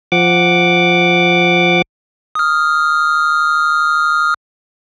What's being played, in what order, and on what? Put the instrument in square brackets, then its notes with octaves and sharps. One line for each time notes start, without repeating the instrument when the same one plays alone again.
[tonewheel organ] F3 F#5 D6
[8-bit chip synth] D#6 F6